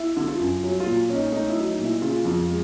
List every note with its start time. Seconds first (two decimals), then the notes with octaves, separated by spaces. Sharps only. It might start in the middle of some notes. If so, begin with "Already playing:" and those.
Already playing: E4
0.16 D3
0.28 F4
0.39 F#2
0.63 F#3
0.80 F4
0.86 A#2
1.09 C#4
1.15 D#4
1.32 A3 D#4
1.49 E4
1.56 F#3
1.67 D#4
1.79 A#2
1.85 E4
2.02 C#3 F4
2.25 F2
2.48 G#3